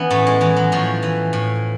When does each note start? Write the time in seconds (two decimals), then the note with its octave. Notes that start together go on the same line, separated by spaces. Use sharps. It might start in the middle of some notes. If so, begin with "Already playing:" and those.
Already playing: E3 B3 C#4
0.11 A2 A3
0.27 G#3
0.41 E3 G#3
0.56 F#3
0.72 A2 F3
1.03 E3
1.33 A2